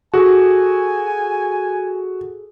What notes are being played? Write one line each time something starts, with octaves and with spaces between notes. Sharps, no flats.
F#4 G#4 A4 G#5